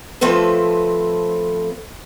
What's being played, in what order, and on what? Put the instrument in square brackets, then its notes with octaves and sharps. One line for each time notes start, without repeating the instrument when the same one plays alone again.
[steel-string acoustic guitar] F3 A3 C4 A4 B4